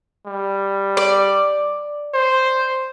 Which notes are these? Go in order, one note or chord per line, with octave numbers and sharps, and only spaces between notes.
G3
D5
C5